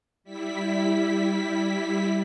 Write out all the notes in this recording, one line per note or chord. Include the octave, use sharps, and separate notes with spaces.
G3 E4 B6